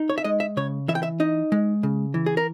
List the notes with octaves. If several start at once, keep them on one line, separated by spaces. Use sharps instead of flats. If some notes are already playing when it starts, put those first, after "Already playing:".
Already playing: D#4
C#5
E5
G#3 D#5
E5
C#3 C#5
E3 E5
G5
E5
D#4 D#5
G#3
C#3
E3
G#4
A#4